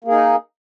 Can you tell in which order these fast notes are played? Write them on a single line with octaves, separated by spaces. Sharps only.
A#3 G#4 D#4